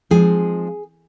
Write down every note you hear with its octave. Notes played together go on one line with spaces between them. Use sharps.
F3 G#3 C4 D#4 G#4